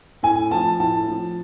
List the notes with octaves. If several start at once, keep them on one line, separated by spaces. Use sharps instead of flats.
A2 G#5
F3 A5
A2 A5
F3